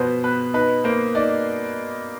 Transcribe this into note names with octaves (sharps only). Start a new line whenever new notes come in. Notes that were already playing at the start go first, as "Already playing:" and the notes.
Already playing: B2 F3 B3 B4 C5
B3 B4
D#4 B4
A#3 C5
D#4 D5